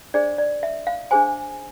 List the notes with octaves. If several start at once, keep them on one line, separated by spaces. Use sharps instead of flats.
D4 G#4 C5 D5
D5
E5
F5
D4 G#4 C5 G#5